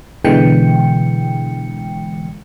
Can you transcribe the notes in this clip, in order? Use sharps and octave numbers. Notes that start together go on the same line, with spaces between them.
B2 D3 E3 G#3 G5 C#7